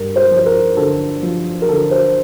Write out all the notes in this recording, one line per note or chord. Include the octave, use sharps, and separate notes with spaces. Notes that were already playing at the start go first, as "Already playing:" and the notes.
Already playing: G2 A#4
C5
F3
C5
A#4
D3 A4
F3
A#4
D3 A4
C5